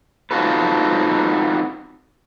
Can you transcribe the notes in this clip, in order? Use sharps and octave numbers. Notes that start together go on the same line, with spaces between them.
C4 D#4 F4 F#4 A4 B4